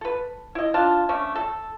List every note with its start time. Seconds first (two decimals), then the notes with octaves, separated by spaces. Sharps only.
0.01 A4 B4
0.55 E4 D#5
0.74 D4 F4 A5
1.09 A3 C#4 D4
1.35 A4